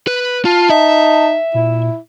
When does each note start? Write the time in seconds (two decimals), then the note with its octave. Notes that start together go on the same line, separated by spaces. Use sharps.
0.07 B4
0.45 F4 A5
0.70 D#4 E5
1.54 A#2 E4